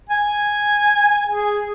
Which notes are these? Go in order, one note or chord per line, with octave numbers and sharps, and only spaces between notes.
G#5
G#4